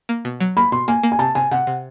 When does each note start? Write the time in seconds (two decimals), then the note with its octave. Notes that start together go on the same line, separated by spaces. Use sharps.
0.09 A#3
0.25 B2
0.40 F#3
0.57 A#3 B5
0.72 B2 C6
0.88 A#3 G#5
1.03 A#3
1.12 G#5
1.19 C3 A5
1.35 C3 G#5
1.51 C3 F#5
1.67 C3